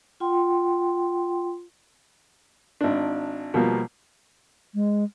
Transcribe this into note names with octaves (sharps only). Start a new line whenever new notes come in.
F4 F#5 G5 C6
G#1 D4
B2 F3 G3 A#3
G#3